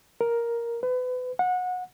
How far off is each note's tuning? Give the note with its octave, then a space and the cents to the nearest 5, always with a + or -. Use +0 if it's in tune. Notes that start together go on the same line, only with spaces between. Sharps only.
A#4 +5
B4 +30
F#5 -25